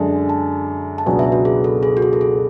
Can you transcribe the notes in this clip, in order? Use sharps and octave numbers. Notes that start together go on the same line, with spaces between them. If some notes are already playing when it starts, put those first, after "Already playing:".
Already playing: F#2 D3 G#3 D4 A4
A5
A5
C#2 B2 F#3 B3 D4 G#5
E5
F#4
G#4
A4
G#4
F#4
G#4
A4
G#4